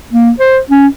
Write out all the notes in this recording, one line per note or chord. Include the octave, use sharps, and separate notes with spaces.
A#3
C5
C#4